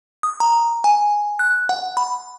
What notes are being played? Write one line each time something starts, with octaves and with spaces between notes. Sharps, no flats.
D#6
A#5
G#5
F#6
F#5
B5